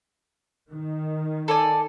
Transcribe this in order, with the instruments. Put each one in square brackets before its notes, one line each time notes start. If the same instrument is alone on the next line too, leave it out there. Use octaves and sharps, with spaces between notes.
[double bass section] D#3
[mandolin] A4 D5 G#5